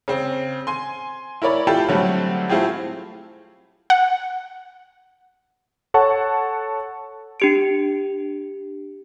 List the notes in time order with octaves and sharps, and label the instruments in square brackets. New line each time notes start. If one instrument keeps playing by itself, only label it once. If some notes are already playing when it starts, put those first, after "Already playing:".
[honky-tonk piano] C#3 C4
G#5 C6
E4 A#4 C#5 D5 B5
E4 F4 G4 A4 A5 B5
D3 F#3 G3 A3 C4
A3 C4 E4 F4 G4 G#4
[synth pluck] F#5
[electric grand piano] A4 C#5 F#5 A5 C#6
[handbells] D4 G4 D7